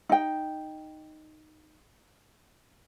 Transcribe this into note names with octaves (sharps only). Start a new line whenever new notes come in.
D#4 G5